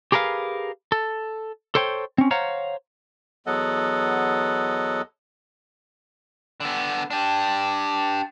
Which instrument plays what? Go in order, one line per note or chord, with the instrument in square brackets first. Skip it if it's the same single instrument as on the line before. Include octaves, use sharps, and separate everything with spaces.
[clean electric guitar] G4 G#4 A#4 B4 F5
A4
A4 C5 C#5 G5
C4 C#4
C5 C#5 F5 F#5 A#5
[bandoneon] E2 F#3 B3 A4 D#5 F#5
[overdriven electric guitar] D3 B3
D4 G4